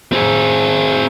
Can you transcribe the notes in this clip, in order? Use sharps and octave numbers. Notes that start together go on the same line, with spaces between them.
C4 G#4